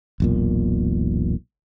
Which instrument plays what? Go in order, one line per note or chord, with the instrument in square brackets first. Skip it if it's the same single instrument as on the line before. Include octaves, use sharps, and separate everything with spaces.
[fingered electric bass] E1 B1 A#2